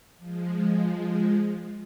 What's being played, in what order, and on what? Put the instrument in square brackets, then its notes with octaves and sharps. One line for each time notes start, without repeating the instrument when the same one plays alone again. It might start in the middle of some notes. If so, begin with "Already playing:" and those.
[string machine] F3 G#3